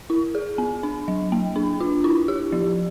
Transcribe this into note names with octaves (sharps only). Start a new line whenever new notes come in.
E4
G#4
B3
D4
F#3
A#3
D4
F4
E4
G4
F3